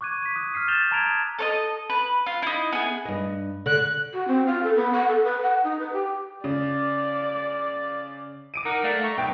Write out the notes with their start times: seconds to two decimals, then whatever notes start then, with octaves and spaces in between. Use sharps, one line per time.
0.01 C#6 D6 F#6 G#6 D#7
0.22 B6 D#7
0.36 D#6 F#6
0.54 F6 B6 C7 D#7
0.68 F#6 G6 A6 E7 F7 G7
0.91 A5 A#5 D#6 G#6 D7 F7
1.39 A4 C#5 D#5
1.90 B4
2.27 F4
2.42 D#4 E4
2.73 B3 G#4
3.05 G2 D#5
3.66 D3 F#6
4.13 F#4
4.28 C4
4.46 F4
4.63 A4
4.76 B3
4.93 F#5
5.08 A4
5.23 B4
5.43 F#5
5.63 D#4
5.79 B4
5.93 G4
6.44 C#3 D5
8.54 D6 D7 D#7
8.65 D#4 A#4 F#5
8.84 A3 D5 F5
9.04 A#5 C#6
9.18 B1 B4 G5 D6